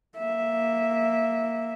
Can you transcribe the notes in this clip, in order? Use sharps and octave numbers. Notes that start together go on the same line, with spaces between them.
A#3 E5